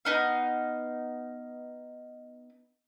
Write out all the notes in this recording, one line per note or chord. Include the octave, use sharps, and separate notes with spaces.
B3 D#4 F5